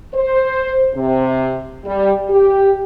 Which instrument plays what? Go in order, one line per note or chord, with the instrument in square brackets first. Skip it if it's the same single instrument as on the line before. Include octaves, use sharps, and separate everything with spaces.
[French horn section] C5
C3
G3
G4